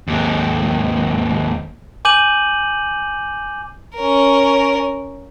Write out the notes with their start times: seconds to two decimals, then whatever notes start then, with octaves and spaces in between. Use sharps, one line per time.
0.08 D#2 G#2
2.05 G#5 D6 G6 D#7 F#7
3.95 C#4 A#4